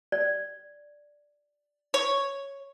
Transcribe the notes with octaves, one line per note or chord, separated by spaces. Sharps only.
D5
C#5